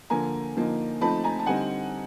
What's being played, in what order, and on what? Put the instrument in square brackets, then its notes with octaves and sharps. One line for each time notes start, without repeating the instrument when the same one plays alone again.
[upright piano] D3 F3 A#3 G#5 A#5
D3 F3 A#3 D#4
F3 A3 C4 D#4 A5 B5
G#5 A#5
A5
D3 G3 C4 D#4 F#5 G#5